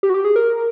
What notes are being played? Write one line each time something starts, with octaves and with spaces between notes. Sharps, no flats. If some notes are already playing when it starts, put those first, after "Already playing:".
G4
F#4
G4
G#4
A#4